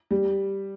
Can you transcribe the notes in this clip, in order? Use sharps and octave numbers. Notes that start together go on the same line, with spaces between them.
G3